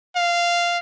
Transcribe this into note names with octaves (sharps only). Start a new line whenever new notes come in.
F5